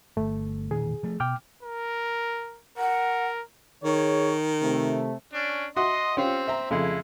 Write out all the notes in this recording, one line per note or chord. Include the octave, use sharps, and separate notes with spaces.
G1 A3
E1 A#2 D#3 G#4
F3 A3
B2 G5 D6 F6
A#4
A#4 F#5
D#3 G#4 C#5
C3 A3
C#4 D4
F#4 D#5 E5 C6 D#6
C4 C#4 F4 G4
E5 G5 A#5
F2 C#3 G#3 A3 E4